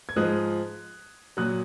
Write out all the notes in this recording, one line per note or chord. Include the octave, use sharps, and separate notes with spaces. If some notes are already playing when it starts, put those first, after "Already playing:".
G#6
G#2 F3 G#3 D#6 F#6
A#2 F#3 D#6 F#6